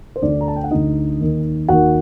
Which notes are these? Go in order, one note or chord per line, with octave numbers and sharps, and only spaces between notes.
C5
D2 D3 D4 D5
A#5
A5
G5
F#5
D2 D3 D#4 D#5
D#2 D#3
D#2 D#3 F#4 F#5